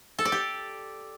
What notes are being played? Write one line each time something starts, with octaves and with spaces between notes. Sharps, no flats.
A4
D5
G4